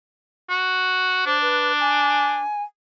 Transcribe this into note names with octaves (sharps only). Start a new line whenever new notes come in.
F#4
D4 C5
B4
G#5